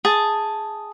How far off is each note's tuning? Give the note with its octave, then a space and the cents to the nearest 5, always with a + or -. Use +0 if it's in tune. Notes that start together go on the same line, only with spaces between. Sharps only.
G#4 +0 A5 +0